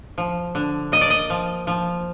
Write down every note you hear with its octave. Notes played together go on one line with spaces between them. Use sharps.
F3
D3
A#3 D#5
D5
D#5
F3
F3